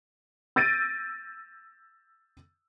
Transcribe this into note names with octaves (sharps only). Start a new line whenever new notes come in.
E6 G6 A6 A#6 D7 D#7